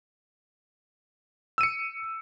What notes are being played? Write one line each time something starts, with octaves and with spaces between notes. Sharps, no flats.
E6 C#7 D#7